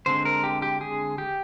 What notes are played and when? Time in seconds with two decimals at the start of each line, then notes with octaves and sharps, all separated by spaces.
0.06 D3 G#3 C4 C5
0.25 A#4
0.44 G4
0.62 G4
0.81 G#4
1.18 G4